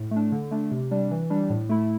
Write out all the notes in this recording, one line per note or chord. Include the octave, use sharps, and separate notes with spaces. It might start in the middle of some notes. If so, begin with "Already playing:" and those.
Already playing: A2
A3
D4
D3
A3 D4
C3
G3 D4
E3
G3 D4
A2
A3 E4